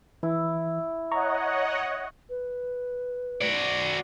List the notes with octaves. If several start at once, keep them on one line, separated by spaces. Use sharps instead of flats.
E3 E4
C#5 D#5 F#5 A#5 C#6
B4
F#4 D5